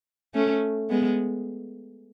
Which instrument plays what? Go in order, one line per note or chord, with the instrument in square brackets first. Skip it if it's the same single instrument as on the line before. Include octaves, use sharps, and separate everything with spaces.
[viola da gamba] A3 C#4
G#3 B3